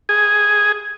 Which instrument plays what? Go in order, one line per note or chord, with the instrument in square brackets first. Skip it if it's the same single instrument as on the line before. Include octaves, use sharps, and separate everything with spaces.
[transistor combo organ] G#4